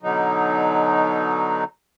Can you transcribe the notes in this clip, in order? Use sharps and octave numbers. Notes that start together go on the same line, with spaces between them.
B2 D3 F#3 D#4